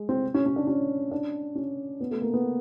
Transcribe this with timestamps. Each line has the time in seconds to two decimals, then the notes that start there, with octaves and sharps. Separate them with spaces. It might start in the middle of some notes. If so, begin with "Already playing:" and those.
Already playing: G#3
0.09 C4
0.34 C#4
0.46 C#4
0.56 D4
0.67 C#4
1.11 D4
1.55 C#4
2.00 B3
2.11 A3
2.22 A#3
2.33 B3